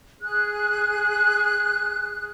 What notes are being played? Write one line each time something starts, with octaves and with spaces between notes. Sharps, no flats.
G#4 F#6